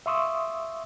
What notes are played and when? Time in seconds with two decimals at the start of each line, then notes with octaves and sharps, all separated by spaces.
0.06 E5 F5 C6 C#6 D#6 E6